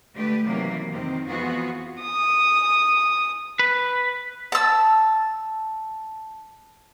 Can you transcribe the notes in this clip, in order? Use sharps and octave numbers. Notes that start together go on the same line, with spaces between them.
D3 A3 G4 B4
C3 D#3 E3 F#3 A#3
F2 C3 D#3 C4
F2 E3 B3 F4 F#4 G#4
D#6
B4
A5 E6